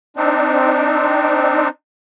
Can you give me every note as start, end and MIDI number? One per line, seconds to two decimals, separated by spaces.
0.17 1.69 60
0.17 1.69 62
0.17 1.69 63